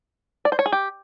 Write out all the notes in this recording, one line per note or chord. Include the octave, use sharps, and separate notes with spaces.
D5
C5
C#5
G#4
G4